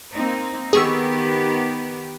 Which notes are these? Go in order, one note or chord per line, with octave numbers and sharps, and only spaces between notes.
A#3 C4 D#4
D#3 B3 G4 G#4 C#6 E6